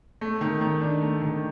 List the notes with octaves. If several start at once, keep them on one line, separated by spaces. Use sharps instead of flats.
A3
D#3
D#3
D4
A3
D#3